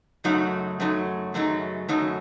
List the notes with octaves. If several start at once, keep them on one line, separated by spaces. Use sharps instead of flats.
F#2 C#3 F#3 A3 D#4
F#2 C#3 F#3 A3 D#4
F#2 C#3 F#3 A3 D#4
F#2 C#3 F#3 A3 D#4